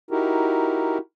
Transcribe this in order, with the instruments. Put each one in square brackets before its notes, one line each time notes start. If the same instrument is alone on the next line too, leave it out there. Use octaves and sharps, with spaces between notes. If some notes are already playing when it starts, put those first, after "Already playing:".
[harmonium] D#4 E4 F#4 G4 A#4